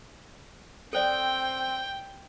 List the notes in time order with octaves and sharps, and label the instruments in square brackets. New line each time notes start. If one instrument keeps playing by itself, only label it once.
[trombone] C4 [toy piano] A4 C5 D5 [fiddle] G5